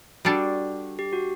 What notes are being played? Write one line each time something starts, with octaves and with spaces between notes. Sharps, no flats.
G3 D4 F#4 A4
G4
F#4